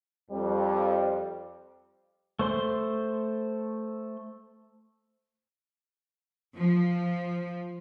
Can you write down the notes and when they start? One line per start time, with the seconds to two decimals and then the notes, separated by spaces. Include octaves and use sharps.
0.30 F2 G3
2.39 A3 C5 C6
6.57 F3